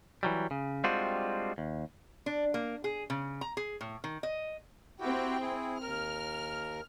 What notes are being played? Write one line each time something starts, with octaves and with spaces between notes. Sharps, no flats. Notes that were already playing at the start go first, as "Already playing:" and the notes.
E3 F#3 G3
C#3
G3 G#3 C4 D4 F4 F#4
D#2
D4
A#3
G#4
C#3
A#5
G#4
A2
D#3
D#5
C4 E4 F#4 G4 G5
E4 G#4
D#2 A#4 F6